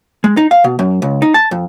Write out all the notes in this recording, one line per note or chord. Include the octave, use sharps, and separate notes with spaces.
G#3
D#4
F5
B2
F#2
C#2
D#4
A5
F2